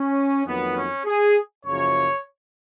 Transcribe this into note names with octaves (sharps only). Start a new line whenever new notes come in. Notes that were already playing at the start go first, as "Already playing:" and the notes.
Already playing: C#4
F2 D#3 F#3 A#3 B3
C#4
G#4
F#1 F#2 C#3 F3 A#3 C#5